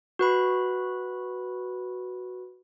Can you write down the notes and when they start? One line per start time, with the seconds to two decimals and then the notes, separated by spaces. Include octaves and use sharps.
0.19 F#4 B4 B5